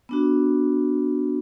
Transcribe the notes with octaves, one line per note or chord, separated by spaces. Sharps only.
B3 D4 F#4